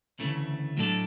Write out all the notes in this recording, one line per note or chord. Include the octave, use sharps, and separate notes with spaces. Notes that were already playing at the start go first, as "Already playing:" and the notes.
D2 C#3 E3 A3
A2 F#3 A3 D4 A4